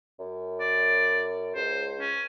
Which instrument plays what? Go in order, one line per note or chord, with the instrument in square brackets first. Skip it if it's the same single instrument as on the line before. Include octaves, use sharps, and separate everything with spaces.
[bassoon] F#2
[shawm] D5
[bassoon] C#2 [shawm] C5
[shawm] C#4